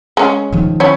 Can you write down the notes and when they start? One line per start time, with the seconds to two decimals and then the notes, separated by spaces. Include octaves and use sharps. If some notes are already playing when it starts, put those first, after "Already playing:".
0.17 G#3 C#4
0.53 D#3 F3
0.80 C#4 E4 C#5